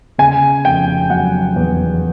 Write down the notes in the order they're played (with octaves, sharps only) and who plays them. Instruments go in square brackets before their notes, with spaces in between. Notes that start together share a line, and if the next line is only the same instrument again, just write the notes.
[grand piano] C#3 G#5
F1 G5
F#3 F#5
E2